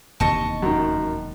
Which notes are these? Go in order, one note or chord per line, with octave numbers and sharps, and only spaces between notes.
E1 D#2 C3 D#5 A5 C#6
F#2 D#3